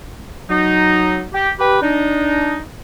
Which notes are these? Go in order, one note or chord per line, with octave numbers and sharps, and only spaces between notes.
F#3 D#4
G4
G4 B4
D4 D#4